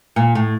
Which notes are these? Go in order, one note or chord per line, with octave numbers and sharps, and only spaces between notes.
A#2
A2